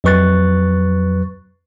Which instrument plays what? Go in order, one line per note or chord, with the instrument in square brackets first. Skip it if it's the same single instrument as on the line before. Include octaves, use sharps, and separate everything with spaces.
[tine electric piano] F2 F#3 B4 C#6 F#6 A6